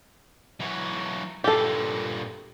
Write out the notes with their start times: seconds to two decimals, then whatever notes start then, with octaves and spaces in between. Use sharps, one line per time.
0.60 E3 F#3
1.44 G2 A#2 G4 A4